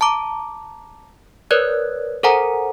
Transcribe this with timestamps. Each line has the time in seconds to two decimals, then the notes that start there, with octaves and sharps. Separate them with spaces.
0.01 A5 A#5 D6
1.51 A#4 B4 C#5 D5 F#6 G#6
2.23 A4 A#4 C5 F#5 G#5 A#5